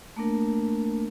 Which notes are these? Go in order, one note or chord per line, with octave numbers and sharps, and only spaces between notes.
A3 A#3 D4 A#4